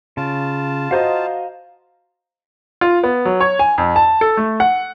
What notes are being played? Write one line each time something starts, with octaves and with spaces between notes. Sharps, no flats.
C#3 F4 A5
F#4 C5 D#5 F5 A#5 D#6
F4
B3
F#3
C#5
G#5
F2
A5
A4
A3
F#5